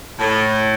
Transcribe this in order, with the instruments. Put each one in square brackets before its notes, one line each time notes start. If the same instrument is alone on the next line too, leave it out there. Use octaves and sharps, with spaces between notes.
[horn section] A2